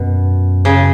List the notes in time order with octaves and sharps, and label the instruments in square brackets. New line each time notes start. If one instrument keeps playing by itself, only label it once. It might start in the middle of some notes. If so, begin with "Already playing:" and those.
Already playing: [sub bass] F#2 [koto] B2
[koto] C#3